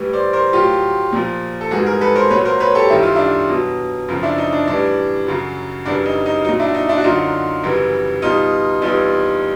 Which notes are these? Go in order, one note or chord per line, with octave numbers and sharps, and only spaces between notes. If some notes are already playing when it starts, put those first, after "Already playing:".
Already playing: A2 E3 G3
C5 D5
A#4 C5
A2 F#3 F4 G4
A#2 F3
A4
G#2 E3 G3 F#4 G#4
G#4 A#4
A4 B4
A#4 C5
A#2 F#3 B4 C#5
A#4 C5
B4 C#5
G4 A4
F#2 D#3 G3 E4
F4
D4 E4
B2 F#3
F#2 C#3 F3
D4 E4
D#4
D4
A2 E3 G3 D4
F#2 C#3 F#3
F#2 C#3 E3 G3 D4
D#4
D#4
A#2 F#3 D#4
D4 E4
D#4
D4 E4
F#4
F#2 D3 F#3 D#4 F4
F#2 C#3 E3 G3
B2 G3 D#4 F4
E2 C3 E3 G3 D#4 F4